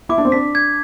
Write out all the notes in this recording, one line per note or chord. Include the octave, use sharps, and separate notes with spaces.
E4 D6
D4
C4
D4 B6
G#6